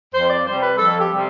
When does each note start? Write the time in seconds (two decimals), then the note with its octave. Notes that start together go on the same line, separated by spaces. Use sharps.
0.14 F2 C5
0.30 D5
0.46 C3 G3 C5
0.62 B4
0.78 F2 A4
1.00 G4
1.11 C3 G3